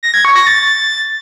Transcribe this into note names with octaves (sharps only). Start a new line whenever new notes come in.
A#6
G#6
C#6
A#6
A6